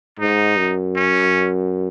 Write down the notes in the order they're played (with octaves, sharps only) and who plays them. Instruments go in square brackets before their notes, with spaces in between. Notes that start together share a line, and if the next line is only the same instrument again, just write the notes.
[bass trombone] G#2 [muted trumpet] D#4
[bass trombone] F#2
[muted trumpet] C#4